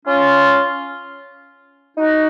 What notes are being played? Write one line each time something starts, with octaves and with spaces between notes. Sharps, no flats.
C#4 F4
D#4 F#4